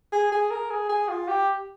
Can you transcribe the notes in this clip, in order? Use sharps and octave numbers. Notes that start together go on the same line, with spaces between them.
G#4
G#4
A#4
G#4
G#4
F4
G4